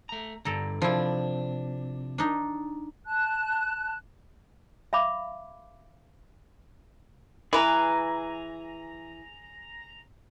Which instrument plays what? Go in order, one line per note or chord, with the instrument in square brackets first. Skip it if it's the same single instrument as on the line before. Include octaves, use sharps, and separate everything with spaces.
[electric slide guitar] A3 A#5
[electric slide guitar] G2 D3 [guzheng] A4 A#5
[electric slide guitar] C3 D4 [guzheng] F3 E4
[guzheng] D4 D#4
[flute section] A5 F#6
[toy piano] E5 F5 B5 D6
[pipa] E3 B4 [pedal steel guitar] G#4 A#5